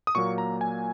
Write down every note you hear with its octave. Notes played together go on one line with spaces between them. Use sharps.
D#6
A#2 F#3 A#3 C#6
A#5
G#5